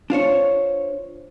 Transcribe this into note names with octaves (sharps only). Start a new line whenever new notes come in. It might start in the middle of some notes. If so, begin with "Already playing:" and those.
D4 F4 C5 C#5